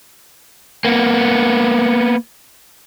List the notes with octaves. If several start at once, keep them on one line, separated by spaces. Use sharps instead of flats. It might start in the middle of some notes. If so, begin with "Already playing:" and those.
A#3 B3